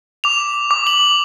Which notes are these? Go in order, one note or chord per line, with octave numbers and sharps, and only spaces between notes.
D6 F7
D6
F#7